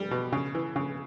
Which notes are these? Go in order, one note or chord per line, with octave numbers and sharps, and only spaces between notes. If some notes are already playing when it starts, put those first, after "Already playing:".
Already playing: G3
B2
C#3
E3
C#3